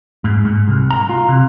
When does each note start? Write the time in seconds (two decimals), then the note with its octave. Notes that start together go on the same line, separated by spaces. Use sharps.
0.24 G#2
0.45 G#2
0.68 C2
0.91 A#5
1.09 F4
1.29 C3